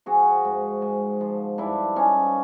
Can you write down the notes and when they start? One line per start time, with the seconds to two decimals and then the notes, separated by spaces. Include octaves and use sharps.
0.06 F3 F#4 G#4
0.45 G#2
0.82 G#2
1.21 F3
1.58 G2 D4 E4
1.96 F3 C#4 D#4